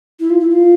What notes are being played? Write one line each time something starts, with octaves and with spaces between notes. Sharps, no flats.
E4
F4
E4
F4